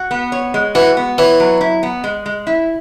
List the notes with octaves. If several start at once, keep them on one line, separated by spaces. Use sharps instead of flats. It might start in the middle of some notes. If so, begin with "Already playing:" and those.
Already playing: F#4
B3
C#5
G#3
E3 F#4
B3
E3 C#5
F#3
E4
B3
G#3
G#3
E4